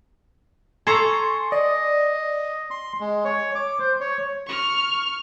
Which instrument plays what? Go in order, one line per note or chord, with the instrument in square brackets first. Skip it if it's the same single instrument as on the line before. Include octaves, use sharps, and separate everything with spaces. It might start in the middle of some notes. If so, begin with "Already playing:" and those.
[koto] A4 A#5 [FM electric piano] G#5 C6 C#6
[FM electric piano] D5 [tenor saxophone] D#5
[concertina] C6
G#3
C#5
D6
C5
C#5
[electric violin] C#6 F6